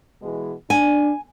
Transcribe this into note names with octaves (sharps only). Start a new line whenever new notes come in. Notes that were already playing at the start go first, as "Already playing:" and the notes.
B2 E3 G#3
D4 G#5